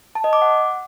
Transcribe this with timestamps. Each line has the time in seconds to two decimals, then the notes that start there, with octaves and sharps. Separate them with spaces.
0.15 A5
0.24 D#5
0.33 D6
0.42 F#5